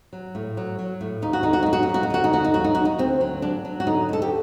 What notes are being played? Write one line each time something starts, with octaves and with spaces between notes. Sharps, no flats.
F#3
A2
F#3
F#3
A2
D#2 D#4
F#4
D3 D#4
F#4
F#3 D#4
F#4
D#4
D#2 F#4
D#4
D3 F#4
D#4
D#2 F#4
D#4
F#3 F#4
D#4
D#2 F#4
D#4
D2 C4
F#3
F#3 D4
F#3
F#4
D3 D#4
D2 A4
G4